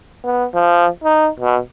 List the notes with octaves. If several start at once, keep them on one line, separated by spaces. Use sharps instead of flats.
B3
F3
D#4
B2